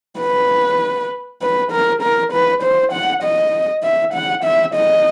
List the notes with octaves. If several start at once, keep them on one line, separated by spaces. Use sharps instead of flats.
B4
B4
A#4
A#4
B4
C5
F#5
D#5
E5
F#5
E5
D#5